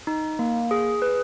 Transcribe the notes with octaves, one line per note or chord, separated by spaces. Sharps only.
D#4
A#3
G#4
B4